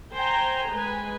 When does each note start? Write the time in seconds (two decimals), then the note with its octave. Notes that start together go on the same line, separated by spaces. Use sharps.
0.14 C5 G5 G#5 A#5
0.72 G#3 B4 G#5